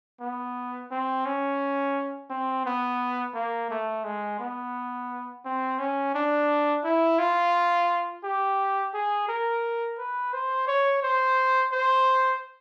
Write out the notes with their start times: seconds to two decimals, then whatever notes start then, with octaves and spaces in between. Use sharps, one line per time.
0.21 B3
0.91 C4
1.26 C#4
2.30 C4
2.66 B3
3.35 A#3
3.71 A3
4.04 G#3
4.40 B3
5.45 C4
5.79 C#4
6.15 D4
6.84 E4
7.19 F4
8.24 G4
8.94 G#4
9.28 A#4
9.99 B4
10.33 C5
10.68 C#5
11.03 C5
11.72 C5